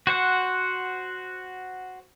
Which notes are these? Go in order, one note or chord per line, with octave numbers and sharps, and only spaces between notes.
F#4 C5 F#5